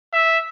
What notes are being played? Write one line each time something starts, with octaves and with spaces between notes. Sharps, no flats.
E5